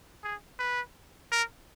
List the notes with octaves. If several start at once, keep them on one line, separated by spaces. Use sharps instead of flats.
G#4
B4
A#4